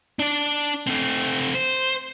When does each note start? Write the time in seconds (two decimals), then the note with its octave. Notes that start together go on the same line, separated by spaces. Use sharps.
0.19 D4 D5
0.87 A3 C4
1.54 C5